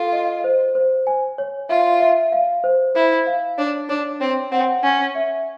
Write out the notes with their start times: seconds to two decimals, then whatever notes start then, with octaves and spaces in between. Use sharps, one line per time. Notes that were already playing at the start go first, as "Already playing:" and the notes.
Already playing: F4 A4
0.13 D#5
0.44 C5
0.75 C5
1.07 G#5
1.38 C#5
1.69 F4 E5
2.00 E5
2.32 F5
2.64 C5
2.95 E4 C5
3.27 F5
3.58 D4 C#5
3.89 D4 C#5
4.21 C4 C#5
4.52 C4 F#5
4.83 C#4 G#5
5.15 E5